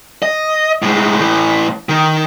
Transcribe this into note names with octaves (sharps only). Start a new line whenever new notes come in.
D#5
A2 G#3
A2 E3
D#3